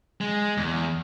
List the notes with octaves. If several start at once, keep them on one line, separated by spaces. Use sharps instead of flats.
G#3
E2